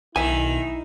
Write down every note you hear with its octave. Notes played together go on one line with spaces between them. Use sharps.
B1 D#3 E4 E5 G#5